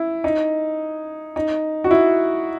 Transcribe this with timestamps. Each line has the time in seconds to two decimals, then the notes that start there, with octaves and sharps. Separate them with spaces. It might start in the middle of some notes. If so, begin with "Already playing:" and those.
Already playing: E4
0.24 D#4
1.36 D#4
1.84 F#4
1.91 E4